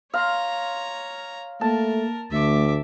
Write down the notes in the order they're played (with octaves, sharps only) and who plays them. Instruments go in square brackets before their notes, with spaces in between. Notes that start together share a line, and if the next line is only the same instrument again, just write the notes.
[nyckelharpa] C#5 A#5 [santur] F5 C6
[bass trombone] A3 [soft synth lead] A#3 [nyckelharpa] A#4 [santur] A5
[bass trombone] D2 [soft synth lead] A3 [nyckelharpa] E5 D6